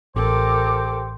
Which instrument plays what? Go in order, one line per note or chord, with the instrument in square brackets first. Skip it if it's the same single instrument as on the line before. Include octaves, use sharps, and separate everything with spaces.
[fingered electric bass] A1 [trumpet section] G4 C5 [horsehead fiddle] A4 A#4 [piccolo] D6